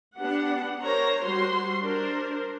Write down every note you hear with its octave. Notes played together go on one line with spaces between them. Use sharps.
B3 D4 G4 F#5
A#4 C5 C#5 A#5
G3 F#4 C5 C6
D4 A#4 C5